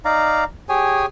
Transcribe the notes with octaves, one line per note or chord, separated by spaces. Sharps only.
D#4 D5 F5 A#5
G4 G#4 C#5 G#5